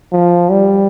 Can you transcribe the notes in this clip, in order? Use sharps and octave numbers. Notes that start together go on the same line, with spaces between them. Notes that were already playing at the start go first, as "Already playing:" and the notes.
F3
G3